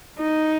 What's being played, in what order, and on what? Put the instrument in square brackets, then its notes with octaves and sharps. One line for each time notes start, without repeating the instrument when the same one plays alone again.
[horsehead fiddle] D#4